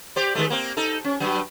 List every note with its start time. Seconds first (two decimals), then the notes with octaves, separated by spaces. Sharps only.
0.16 G4 C5 D5
0.35 D#3 G#3 A3
0.50 A#3 C4
0.77 D#4 A4
1.04 C#4
1.20 G2 F#3